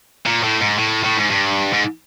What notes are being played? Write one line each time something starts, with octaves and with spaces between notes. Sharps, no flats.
A#2
A2
G#2
A2
A2
G#2
G2
G#2